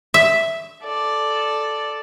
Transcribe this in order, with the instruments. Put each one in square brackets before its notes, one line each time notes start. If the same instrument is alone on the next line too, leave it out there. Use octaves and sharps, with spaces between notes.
[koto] E5
[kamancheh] A4 D5